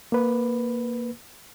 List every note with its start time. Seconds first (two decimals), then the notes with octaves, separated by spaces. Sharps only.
0.12 A#3 B4